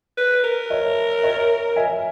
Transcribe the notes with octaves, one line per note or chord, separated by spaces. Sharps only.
B4
A#4
C#5 E5
C#5 E5
E5 G#5